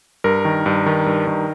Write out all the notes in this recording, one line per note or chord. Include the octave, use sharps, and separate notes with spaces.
G2 A#4
D#3
G2
D#3
G2
D#3